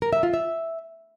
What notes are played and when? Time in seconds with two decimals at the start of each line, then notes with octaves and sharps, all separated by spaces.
0.02 A#4
0.13 E5
0.23 F4
0.34 E5